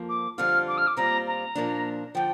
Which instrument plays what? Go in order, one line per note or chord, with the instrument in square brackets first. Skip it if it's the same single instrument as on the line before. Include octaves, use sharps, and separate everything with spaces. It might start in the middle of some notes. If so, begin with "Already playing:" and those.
Already playing: [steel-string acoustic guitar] F2 F3 A#3
[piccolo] D6
[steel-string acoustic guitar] F2 D3 G3 C4 F4 [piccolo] F6
[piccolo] D6
F6
D6
[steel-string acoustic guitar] A#2 G3 C4 F4 [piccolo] A#5
[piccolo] A#5
[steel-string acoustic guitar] A#2 F3 A#3 D4
[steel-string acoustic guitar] D3 F3 [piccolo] G5